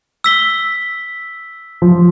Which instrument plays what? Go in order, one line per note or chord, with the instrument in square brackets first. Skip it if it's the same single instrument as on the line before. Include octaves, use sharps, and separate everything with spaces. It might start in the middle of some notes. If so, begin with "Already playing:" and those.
[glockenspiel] E6 B6 G7
[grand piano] F3